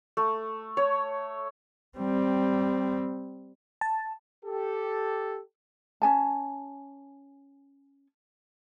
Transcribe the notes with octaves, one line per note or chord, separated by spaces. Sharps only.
A3
C#5
G3 C4
A5
G4 A4
C#4 G#5 A5